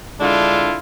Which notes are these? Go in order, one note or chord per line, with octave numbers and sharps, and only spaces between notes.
D3 G#3 D4 E4 F4